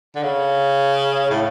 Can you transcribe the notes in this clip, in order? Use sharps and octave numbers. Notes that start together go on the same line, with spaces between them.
D3
C#3
A2